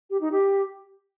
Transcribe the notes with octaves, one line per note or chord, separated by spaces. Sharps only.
G4
D#4
G4